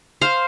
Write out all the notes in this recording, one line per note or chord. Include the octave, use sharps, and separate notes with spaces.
C5 F5